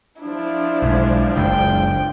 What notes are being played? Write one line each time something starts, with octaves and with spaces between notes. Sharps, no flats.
F3 D4 E4
B1 G#3
F#1 C#2 G5